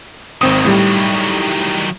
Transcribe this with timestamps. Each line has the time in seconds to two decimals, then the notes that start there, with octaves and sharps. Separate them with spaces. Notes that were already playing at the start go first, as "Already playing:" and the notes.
0.41 G#1 D#3 F#3 C4 D#6
0.65 A2 G3